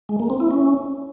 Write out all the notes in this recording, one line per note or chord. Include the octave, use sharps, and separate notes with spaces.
G#3
A#3
C4
E4
C#4